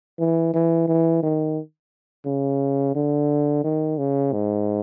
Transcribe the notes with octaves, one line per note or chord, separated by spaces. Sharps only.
E3
E3
E3
D#3
C#3
D3
D#3
C#3
G#2